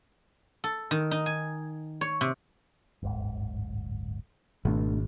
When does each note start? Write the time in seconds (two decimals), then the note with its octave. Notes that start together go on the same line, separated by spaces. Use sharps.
0.64 A4
0.91 D#3
1.11 D#4
1.26 G#5
2.01 C#5
2.21 C3
3.03 D1 G1 G#2
4.65 G#1 B2 A3 D4